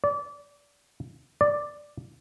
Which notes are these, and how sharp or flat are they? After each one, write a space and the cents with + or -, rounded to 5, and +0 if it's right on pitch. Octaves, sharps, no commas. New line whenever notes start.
D5 -25
D5 +5